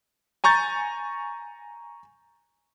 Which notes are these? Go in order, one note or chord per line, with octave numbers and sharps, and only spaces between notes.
G#5 A#5 C#6 G6 A6